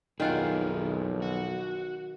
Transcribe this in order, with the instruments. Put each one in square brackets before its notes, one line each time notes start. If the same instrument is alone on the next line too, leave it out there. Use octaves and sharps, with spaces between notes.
[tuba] B1 [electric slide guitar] F2 G#4 [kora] D#3 F4 F#5
[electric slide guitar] F#4